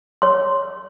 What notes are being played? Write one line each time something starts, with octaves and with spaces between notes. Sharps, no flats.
C#5 C6